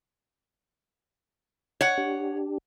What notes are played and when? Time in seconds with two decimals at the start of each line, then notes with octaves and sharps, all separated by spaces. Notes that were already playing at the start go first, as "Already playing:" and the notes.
1.81 C#5 F#5
1.98 D4 G4